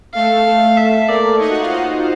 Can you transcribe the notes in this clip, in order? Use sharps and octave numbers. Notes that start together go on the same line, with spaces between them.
A3 A4 F5
A3 A4
E5
A#3 A#4 D5
D#4 C#5 D#5
F#4 F#5
F4 F5
D#4 C5 D#5